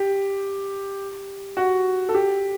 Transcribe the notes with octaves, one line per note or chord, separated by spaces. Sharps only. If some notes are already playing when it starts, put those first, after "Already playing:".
Already playing: G4
F#4
A4
G4